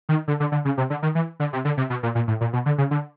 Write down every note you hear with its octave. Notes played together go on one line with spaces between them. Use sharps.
D#3
D3
D3
D3
C#3
C3
D3
D#3
E3
D3
C3
D3
C3
B2
A#2
A#2
A2
A#2
B2
D3
C#3
D3